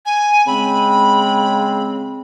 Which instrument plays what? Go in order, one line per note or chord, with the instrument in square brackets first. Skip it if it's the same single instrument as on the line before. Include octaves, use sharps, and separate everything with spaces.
[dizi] G#5
[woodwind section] C#3 G#3 C4 [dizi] B5